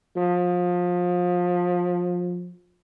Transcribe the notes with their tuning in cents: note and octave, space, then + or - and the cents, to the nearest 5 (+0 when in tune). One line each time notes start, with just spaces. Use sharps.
F3 +25